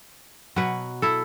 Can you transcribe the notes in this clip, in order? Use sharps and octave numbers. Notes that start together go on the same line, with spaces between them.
B2 F#3 F#4 B4
E4 A4